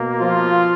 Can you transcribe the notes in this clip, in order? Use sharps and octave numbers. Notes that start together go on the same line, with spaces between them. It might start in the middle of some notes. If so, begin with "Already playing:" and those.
Already playing: B2 A#3
F3 F4